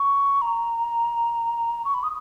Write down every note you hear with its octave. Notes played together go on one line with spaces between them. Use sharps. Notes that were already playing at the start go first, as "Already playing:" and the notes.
Already playing: C#6
A#5
C#6
B5
D#6